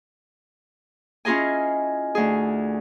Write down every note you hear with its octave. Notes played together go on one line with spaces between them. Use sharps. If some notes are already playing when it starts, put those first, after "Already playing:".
C#4 E4 F4 G#4 D#5 G#5
D2 G#4